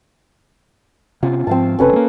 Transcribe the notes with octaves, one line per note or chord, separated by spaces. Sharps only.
C3 B3 C#4 F4
G#2 F3 C4 F5 A5
F1 C3 C#4 A4 B4
G#3 A#3